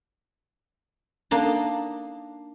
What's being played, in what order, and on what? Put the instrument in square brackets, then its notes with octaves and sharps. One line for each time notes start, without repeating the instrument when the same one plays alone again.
[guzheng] A#3 D4 D#4